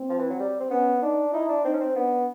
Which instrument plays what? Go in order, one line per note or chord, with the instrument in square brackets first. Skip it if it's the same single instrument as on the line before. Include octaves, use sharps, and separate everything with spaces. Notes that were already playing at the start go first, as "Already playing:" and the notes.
Already playing: [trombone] C4
[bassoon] F3
E3
F#3
G3
C4
[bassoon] B3 [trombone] C#4
[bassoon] D4 [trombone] D#4
[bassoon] D#4 [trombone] E4
[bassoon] D4
[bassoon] C4 [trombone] D#4
[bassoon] C#4
C4
[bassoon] B3 [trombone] D4